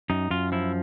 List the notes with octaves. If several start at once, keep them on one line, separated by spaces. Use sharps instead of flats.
F#2 D#4
F#2 F4
F3 E4